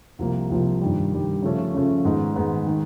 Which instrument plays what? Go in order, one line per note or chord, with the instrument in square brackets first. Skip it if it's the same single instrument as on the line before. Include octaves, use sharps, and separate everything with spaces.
[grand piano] C2 C3 F3 A#3
C2 C3 F3 A#3
G2 D#3 G3
G2 D#3 G3
C#3 F3 A3 C#4
C#3 F3 A3 C#4
G#2 D#3 G#3 B3 D#4
G#2 D#3 G#3 B3 D#4
D#3 G#3